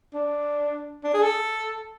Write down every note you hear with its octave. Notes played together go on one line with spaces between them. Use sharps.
D4
D4
G#4
A4